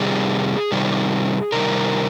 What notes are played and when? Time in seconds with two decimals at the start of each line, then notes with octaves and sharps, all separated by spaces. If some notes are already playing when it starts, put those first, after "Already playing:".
Already playing: C3 D#3 G3 G#4
0.72 C3 D#3 G3
1.52 C3 D#3 G3 A#4